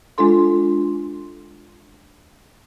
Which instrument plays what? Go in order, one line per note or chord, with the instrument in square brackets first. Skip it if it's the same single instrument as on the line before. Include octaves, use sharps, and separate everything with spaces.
[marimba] G#3 D4 F4 A4 C6